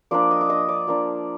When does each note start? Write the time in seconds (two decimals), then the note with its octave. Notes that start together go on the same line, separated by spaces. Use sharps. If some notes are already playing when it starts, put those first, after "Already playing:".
0.11 F3 A#3 D4 D5 D6
0.31 D#5 D#6
0.41 D6
0.50 D#5 D#6
0.69 D5 D6
0.87 F3 A#3 D4